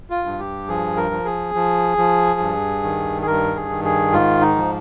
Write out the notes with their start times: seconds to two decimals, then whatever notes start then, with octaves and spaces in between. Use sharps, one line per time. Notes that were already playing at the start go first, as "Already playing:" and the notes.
0.10 F4
0.25 G2
0.39 G4
0.68 F3 G#4
0.97 A#4
1.11 F3
1.25 G#4
1.55 F3
1.97 F3
2.40 G2
2.83 D#3
3.22 G#4
3.27 G2 A#4
3.56 G#4
3.70 D#3
3.84 G#4
4.12 G#2 F4
4.41 D#4
4.56 F3